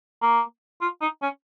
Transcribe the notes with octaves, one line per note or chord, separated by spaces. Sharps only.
A#3
F4
D#4
C#4